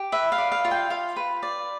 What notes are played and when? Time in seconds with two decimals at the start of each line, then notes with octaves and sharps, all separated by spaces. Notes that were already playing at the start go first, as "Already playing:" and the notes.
Already playing: G4
0.12 B4 E5
0.32 F5
0.38 D5
0.52 F5
0.65 F4
0.71 G5
0.90 F4 F5
1.16 B4
1.43 D5